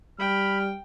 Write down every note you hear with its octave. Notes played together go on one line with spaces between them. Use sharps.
G3 G5 B5 F6